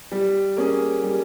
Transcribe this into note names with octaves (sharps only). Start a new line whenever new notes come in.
G3
A#3 C#4 G#4
G3